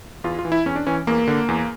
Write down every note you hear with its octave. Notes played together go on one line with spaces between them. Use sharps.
E2 F4
F4
E3
E4
E2 C#4
D4
E3 C#4
E2 A#3
D3
E2